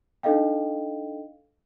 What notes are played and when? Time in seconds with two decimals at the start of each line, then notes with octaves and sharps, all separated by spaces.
0.23 D4 D#4 A4 D#5 F5 G5